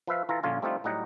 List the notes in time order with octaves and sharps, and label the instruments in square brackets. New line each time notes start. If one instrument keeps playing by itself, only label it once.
[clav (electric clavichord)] F3 B4 E5 F5
E3 F4 A4 A#5
A#1 D3 C#4 F4 G#5
G3 A3 C4 D4 D#4 F4
A2 F#3 G3 D#4 F#5 A#5